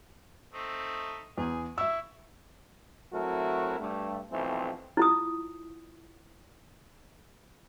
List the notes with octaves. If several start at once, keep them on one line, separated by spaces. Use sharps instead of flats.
A3 C4 D#4
E2 G#4
E4 E5 C#6 E6
F#3 A3 C4 E4 F#4 A#4
G2 A3
B1 E3 F3 A3 C4
E4 F4 D#6